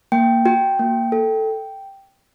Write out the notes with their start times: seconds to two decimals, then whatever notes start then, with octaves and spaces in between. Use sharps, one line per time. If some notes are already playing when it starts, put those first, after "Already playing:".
0.12 A#3 G5
0.46 F#4 G5
0.79 A#3
1.12 A4